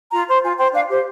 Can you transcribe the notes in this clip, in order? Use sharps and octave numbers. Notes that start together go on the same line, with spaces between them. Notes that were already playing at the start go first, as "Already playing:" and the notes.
F4 A#5
C5
F4 G#5
C5 G5
D4 F5
G4 C5